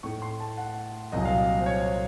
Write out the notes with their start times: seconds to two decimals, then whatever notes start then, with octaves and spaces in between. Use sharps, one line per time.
0.03 A2 A3 D#4 C#6
0.22 C6
0.40 A5
0.58 F#5
1.12 C2 A#2 F#3 D#5
1.25 F5
1.38 D#5
1.60 C5
1.66 C#5